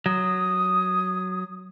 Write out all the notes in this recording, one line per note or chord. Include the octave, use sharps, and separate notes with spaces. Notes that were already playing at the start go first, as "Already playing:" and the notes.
F#3 D#6